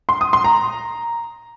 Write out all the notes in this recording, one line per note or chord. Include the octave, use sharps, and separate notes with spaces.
C6
D#6
C6
A#5